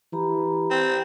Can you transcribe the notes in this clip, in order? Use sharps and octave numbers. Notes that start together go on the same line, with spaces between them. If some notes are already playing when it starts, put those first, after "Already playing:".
E3 G4 A#5 B5
C4